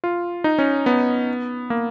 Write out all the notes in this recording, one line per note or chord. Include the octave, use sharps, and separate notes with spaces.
F4
D#4
C#4
B3
A#3